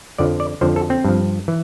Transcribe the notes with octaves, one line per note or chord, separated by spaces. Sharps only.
F2 D3 F3 D5
D5
F2 D3 F3 C5
A4
C4
G2 F3
E3